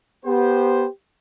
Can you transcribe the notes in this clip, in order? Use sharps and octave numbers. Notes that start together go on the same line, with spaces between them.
B3 G4 C5